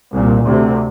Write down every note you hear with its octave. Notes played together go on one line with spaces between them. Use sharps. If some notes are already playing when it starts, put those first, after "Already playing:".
C2 A#2
D2 C3